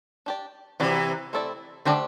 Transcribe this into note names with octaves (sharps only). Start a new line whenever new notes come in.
D4 G4 D5
C3 E3 C4 F#4 B4 D5
A3 C4 E4 A4 D5
D3 A3 D4 G4 C5